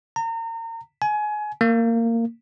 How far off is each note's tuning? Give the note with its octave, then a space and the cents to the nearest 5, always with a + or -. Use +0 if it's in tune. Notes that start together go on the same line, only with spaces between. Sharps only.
A#5 -35
G#5 +25
A#3 -20